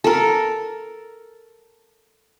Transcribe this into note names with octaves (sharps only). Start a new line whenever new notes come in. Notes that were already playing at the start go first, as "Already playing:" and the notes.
A4 A#4